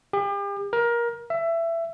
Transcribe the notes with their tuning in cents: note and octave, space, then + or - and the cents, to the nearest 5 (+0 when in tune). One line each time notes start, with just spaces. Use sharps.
G4 +40
A#4 +20
E5 +20